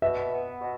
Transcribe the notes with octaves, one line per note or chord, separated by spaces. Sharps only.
B2 E5
B3
B2